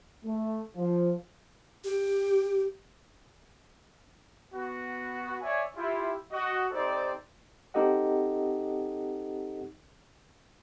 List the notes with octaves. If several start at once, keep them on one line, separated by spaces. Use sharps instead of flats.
A3
F3
G4
B3 F#4
C#5 D5 E5 G#5
E4 F4 G4
F#4 D#5
C4 D#4 G4 A4 C5 D5
C4 D#4 G4 A4 D#5 F#5